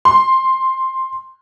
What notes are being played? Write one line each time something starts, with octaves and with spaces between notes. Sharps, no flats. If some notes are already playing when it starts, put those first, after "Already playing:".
C6